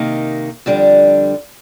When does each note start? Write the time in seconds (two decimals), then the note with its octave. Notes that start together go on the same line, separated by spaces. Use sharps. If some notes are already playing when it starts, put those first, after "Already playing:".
Already playing: C3 D#3 A#3 D#4
0.66 F2 D3 G3 D4